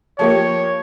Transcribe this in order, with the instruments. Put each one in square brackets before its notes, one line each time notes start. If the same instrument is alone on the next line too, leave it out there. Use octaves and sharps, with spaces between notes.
[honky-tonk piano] F3 A#3 G4 [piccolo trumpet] C#5